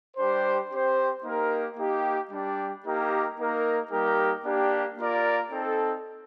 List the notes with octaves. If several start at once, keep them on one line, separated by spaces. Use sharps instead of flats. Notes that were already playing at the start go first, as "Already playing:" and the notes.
G3 D4 G4 C5
C4 G4 C5
A#3 D#4 G4 A#4
A#3 D#4 G4
G3 D4 G4
A#3 D#4 G4 A#4
A#3 D#4 A#4
G3 A#3 D#4 G4 A#4
A#3 D4 G4
A#3 F4 A#4 D5
C4 D#4 A4